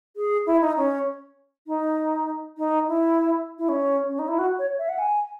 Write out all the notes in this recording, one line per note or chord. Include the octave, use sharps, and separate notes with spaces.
G#4
E4
D#4
C#4
D#4
D#4
E4
E4
C#4
C#4
D#4
E4
F#4
C#5
E5
F#5
G#5